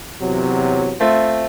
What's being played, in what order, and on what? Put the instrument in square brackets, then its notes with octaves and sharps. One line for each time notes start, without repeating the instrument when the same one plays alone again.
[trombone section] E2 C3 F#3
[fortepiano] A3 C4 F4